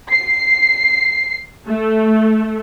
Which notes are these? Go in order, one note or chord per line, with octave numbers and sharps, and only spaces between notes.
C7
A3